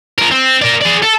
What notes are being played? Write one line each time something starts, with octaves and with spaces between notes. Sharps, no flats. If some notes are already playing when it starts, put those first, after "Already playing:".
F3 A#4
C4
A#4 D5
G#4 D5
A4